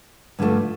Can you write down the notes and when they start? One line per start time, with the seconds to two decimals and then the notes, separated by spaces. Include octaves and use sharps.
0.39 G2 D3 F3 A3